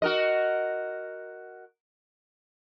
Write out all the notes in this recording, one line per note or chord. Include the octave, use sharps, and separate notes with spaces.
F#4 A#4 D#5